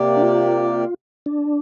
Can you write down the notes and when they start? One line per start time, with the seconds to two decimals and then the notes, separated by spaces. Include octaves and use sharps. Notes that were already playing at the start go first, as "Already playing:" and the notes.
Already playing: C3 A#3 G4 D5
0.17 D4
0.22 F4
1.26 D4